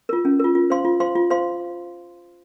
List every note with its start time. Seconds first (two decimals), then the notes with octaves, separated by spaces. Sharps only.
0.09 F4 A#4
0.25 C#4
0.40 F4 A#4
0.55 F4
0.70 C5 F5 C6
0.85 F4
1.00 C5 F5 C6
1.15 F4
1.30 C5 F5 C6